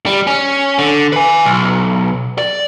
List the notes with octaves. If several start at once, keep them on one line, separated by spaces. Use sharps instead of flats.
G3
C#4
D3
B4 G#5
B1
D5